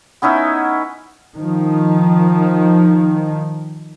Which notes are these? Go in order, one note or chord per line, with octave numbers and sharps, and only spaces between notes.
B3 C#4 D#4 E4
D#3 F3